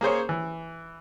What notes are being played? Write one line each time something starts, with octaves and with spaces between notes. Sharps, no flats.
A#3 G#4 C5 C#5
E3